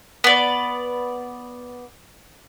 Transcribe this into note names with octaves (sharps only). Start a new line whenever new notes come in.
B3 D5